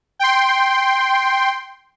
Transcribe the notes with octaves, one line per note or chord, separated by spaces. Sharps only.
G5 C6